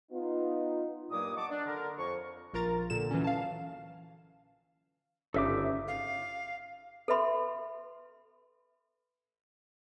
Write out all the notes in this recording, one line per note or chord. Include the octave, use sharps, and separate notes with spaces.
B3 D#4 F4
G2 A#2 F#3 A#3 D6 D#6
D#5 F#5 A5 C#6 D6
D4
D3 A#4
F2 C#5 C#6
A#1 F4 A#4 A#5 A6
A#2 D3 E7
E3 F#3 C#4
F5 A5
G1 C#3 D#4 A4 E5 D6
F5
A4 B4 E5 B5 C6